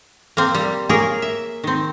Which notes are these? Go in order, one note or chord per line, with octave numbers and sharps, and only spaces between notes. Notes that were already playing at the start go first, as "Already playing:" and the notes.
A#3 C4
G3
A#3 G#4 A#4 C#5
E5
D#3 C4